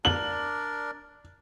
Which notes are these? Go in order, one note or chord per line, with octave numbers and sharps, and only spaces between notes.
D4 A#4 D5 F#7